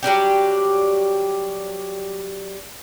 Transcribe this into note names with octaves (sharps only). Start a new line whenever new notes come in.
F#3 G3 D4 G4